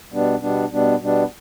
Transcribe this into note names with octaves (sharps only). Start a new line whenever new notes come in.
B2 G3 B3 D4
B2 G3 B3 D4
B2 G3 B3 D4
B2 G3 B3 D4